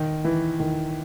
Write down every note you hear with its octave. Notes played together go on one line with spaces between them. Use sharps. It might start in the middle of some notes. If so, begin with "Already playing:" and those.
Already playing: D#3
E3
D#3